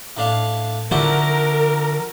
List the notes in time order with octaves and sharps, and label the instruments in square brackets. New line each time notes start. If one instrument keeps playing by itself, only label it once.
[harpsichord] A2 D4 F5
[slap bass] D3 F3 [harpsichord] D4 E4 F#4 [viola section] A#4